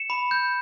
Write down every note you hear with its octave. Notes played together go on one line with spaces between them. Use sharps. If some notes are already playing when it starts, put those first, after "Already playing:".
Already playing: C#7 E7
B5
G6